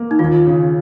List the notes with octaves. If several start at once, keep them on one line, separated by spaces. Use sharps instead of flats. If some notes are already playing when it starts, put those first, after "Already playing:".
Already playing: A#3
D#4
D#2 F4
C#3